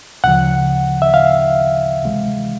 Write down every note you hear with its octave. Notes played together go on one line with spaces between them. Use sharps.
D2 C#3 F3 F#5
E5
F5
C2 C3 E3 G#3